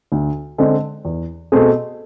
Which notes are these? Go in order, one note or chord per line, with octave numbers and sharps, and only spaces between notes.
D2
D3 G#3 C4
E2
B2 A3 C4 G#4